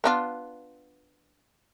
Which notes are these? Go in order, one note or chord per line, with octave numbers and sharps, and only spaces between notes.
B3 D4 F4